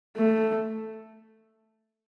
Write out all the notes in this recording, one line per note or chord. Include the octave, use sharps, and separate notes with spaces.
A3